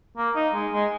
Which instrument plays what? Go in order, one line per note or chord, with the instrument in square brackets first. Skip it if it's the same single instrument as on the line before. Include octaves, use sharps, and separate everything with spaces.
[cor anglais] A#3
D#4
G#3
G#3